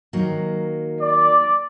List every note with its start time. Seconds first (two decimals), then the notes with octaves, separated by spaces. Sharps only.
0.13 D#3 F#3 A#3
1.00 D5